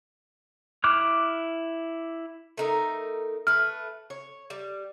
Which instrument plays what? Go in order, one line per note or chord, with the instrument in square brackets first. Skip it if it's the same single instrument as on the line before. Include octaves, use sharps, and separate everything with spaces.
[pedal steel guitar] E4 D6 F6 F#6
[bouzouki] A3 D#4 A#4
[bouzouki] A3 B4 [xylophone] F6
[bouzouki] C#5
G3